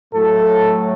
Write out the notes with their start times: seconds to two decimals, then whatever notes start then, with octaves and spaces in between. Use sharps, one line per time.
0.13 A2 F#3 A3 A4